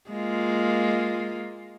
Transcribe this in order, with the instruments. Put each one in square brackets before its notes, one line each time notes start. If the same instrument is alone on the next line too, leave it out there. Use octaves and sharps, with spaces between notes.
[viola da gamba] G#3 A#3 F4